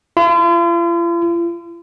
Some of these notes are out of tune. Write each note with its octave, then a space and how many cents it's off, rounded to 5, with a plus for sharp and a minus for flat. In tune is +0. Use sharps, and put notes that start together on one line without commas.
F4 -45